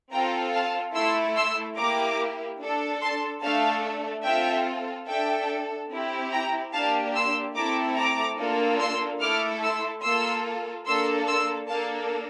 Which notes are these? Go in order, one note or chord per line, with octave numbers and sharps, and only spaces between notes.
C4 F4 A4 G5 A#5
F5 A5
A3 E4 A4 C6 E6
C6 E6
A#3 E4 G4 A#5 D6
D4 A4
A5 C6
A3 D4 A4 F5 A5
C4 F4 A4 E5 G5
D4 A4 E5 G5
C4 E4 G4
G5 A#5
A#3 D4 G4 F5 A5
C6 E6
A3 C4 E4 A4 A#5 D6
A#5 D6
A#3 D4 F4 A4
C6 E6
A3 E4 A4 D6 F6
C6 E6
A#3 F4 A4 C6 E6
A#3 D4 A4 C6 E6
C6 E6
A#3 D4 A4 F5 A5